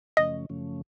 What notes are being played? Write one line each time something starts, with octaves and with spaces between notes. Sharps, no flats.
F#2 C#3 F3 A3 C#4 D#5
F#2 C#3 F3 A3 C#4